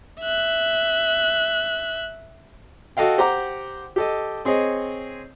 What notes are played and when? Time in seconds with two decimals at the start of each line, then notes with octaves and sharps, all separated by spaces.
0.22 E5 F#6
2.97 F#4 A4 D#5 F5 G5
3.18 G4 C5 F#5 G5 A#5 D6
3.96 G4 A4 D#5
4.45 C4 G#4 C#5 D#5